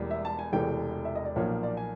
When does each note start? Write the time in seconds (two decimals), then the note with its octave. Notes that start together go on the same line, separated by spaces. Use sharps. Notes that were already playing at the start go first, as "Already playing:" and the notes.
Already playing: E1 E2 B2 G3 A#3
0.11 E5
0.25 A5
0.39 G#5
0.52 E1 E2 C3 E3 A3 G5
1.05 E5
1.15 D#5
1.25 D5
1.36 B1 A#2 F3 A#3 C#5
1.63 D5
1.77 G#5